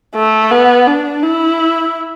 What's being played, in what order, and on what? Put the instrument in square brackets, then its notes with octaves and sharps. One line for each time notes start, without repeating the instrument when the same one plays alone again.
[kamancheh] A3
B3
D4
E4